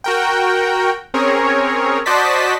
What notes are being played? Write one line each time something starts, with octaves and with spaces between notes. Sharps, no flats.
F#4 A#4 G5
C4 C#4 G#4 A#4 C#5
F#4 C5 D5 D#5 A5 B6